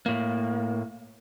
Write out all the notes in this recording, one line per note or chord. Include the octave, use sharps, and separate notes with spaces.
A2 A#3